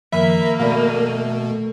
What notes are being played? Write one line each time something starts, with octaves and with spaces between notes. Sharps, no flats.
F#2 D#3 F3 A#3 E5 B5
B2 A3 D5 F5